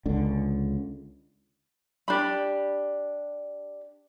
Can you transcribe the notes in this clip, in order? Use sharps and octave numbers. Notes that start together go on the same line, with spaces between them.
C#2 D3
D4 G4 B5